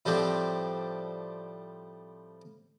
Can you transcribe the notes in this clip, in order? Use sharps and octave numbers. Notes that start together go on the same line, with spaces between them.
A2 F3 G3 C4 D4